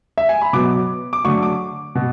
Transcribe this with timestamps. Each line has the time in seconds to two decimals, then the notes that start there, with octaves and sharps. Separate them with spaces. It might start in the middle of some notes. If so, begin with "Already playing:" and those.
0.18 E5
0.29 G#5
0.42 B5
0.53 B2 F#3 B3 D6
1.13 D6
1.24 D3 F#3 A3 C#6
1.43 D6
1.95 B2